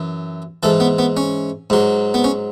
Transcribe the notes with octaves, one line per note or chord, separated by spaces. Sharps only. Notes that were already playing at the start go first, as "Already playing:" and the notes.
Already playing: F#2 E3
G#2 E3 A4
B3
B3
C#4
G#2 F#3
B3
C#4